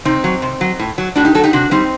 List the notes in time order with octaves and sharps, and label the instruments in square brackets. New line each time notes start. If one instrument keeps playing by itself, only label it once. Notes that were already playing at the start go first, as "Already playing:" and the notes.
[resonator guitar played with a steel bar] C3 C4 D#4
F#3
C3
F#3
A2
F#3
A2 D4 F#4
D#4 G4
F#3 F#4 A4
D#4 G4
C3 D4 F#4
G3 C4 D#4